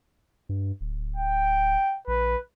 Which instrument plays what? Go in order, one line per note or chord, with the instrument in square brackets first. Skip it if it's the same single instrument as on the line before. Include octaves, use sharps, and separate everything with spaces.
[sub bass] G2
D1
[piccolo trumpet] G5
[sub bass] A#1 [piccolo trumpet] B4